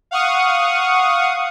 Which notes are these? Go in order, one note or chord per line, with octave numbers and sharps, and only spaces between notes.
F5 F#5 C#6 D#6